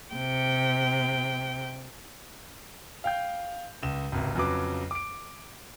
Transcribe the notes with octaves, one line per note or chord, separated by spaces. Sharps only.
C3 G5
F5 G5 G6
C#2 E7
G#1 C#2 C3
F2 C#3 F#3 B4 D6
D6 D7